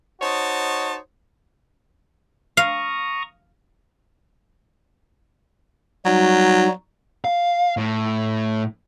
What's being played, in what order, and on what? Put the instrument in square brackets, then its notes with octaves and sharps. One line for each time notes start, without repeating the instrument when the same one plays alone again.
[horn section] D#4 F#4 C5 C#5 D#5 A5
[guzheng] F5 [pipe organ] A#5 C#6 D#6
[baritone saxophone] F#3 [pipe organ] G3 D#4 F#4
[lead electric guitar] F5
A2